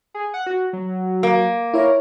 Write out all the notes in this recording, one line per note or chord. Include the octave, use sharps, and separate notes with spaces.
G#4
F#5
F#4
F#3
A#3
E4 A#4 C#5